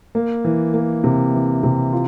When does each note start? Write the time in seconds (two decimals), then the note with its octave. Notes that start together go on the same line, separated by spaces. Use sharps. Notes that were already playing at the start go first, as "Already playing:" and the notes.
0.15 A#3
0.45 E3
0.74 A#3
1.04 C3
1.33 E3
1.63 C3
1.93 F4